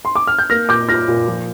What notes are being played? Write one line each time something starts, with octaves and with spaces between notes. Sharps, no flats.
C6
D6
F6
G6
A#3 F6 A#6
A#2 D6 G6
F4 F6 A#6
A#2
F3